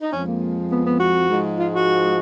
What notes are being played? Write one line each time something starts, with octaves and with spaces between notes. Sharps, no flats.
D#4
F2 F3 G#3 C#4
A#3
B3
B3
F#4
G#2 F3 G#3
F4
F#4